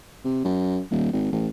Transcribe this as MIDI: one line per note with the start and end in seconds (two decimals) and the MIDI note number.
0.24 0.41 48
0.44 0.80 42
0.91 1.11 27
1.13 1.30 32
1.32 1.48 33